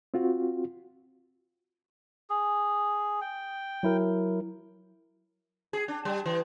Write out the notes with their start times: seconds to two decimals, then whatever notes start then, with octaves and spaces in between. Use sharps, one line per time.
0.14 C4 F4 F#4
2.30 G#4
3.21 G5
3.83 F#3 E4 A#4
5.73 G#4
5.88 D4
6.05 G3
6.26 E3